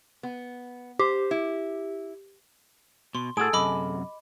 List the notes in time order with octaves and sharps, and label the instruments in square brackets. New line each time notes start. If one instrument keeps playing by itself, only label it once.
[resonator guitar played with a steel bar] B3
[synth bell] G4 [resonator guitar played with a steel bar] C5
[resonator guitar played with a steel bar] E4
[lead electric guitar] B2 [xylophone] C6
[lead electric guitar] A2 F#4 [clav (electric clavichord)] G#4 A4 [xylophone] D7
[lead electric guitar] F#2 C3 [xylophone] D#5 B5 D6